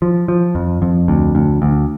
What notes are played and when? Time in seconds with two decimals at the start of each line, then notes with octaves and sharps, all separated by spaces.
0.02 F3
0.28 F3
0.55 F2
0.82 F2
1.08 D2
1.35 D2
1.62 D2